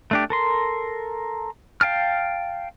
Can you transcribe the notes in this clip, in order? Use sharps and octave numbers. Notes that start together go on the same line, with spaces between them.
A3 D4 G4
A4 A#4 C6
F5 G5 A5 F6